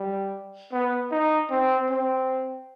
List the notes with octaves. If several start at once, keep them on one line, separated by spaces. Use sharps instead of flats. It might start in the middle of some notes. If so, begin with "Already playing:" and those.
Already playing: G3
B3
D#4
C4
C4